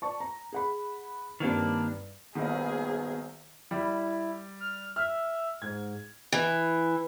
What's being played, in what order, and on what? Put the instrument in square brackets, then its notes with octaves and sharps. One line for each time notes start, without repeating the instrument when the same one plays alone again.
[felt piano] D5 A5 C#6
A#5
G#4 F#5 B5
[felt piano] G2 C4 [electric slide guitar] D#3 A#3 D4
[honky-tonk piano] A#1 D#3 [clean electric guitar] G2 B2 [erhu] G#4
[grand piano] G3 [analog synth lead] E4
[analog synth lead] F6
[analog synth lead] E5 [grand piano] F6
[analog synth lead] G#2 [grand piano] G#6
[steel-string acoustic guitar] E3